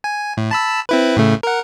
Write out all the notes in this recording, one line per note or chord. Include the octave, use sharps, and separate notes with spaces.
G#5
A2
A5 B5 E6
C4 E4 B4
A2 C#3 A3
A#4 F#5